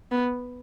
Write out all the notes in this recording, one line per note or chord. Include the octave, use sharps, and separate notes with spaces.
B3